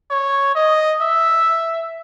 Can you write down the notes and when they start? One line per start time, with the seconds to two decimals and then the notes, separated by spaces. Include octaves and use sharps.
0.11 C#5
0.56 D#5
1.02 E5